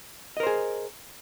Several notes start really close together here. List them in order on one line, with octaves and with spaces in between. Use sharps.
D#5 A#4 C5 G#4